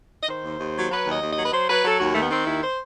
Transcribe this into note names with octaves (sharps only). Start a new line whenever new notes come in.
D#5
D#3 C5
D#2
D#2
F#3
F#3 B4
D#2 D#5
D#2
D#5
F#3
B4
F#3 C5
F#3 B4
F#3 A4
D#2 F#4
D#3 A3
B3
D#3 C4
D#2 E4
C5